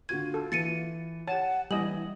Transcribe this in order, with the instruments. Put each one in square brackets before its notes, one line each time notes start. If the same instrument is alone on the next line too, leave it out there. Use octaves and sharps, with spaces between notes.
[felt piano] D3 F#4 D#7 [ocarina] F4 [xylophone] G#6
[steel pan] A4
[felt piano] E3 [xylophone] A6 C#7 D#7
[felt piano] G4 D#7 [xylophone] C#5 [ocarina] F#5 [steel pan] A5
[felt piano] E3 G#5 [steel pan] G3 D#5 [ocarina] E4 [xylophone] F#7